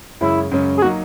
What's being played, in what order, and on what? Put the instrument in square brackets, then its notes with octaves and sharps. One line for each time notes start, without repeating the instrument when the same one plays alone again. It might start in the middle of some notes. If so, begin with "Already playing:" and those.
[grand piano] F#2 C#3 G#3 C#4 [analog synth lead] E4
[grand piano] F#2 C#3 G#3 C#4
[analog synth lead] G#4
[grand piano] F#3 A#3 D#4 [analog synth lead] F#4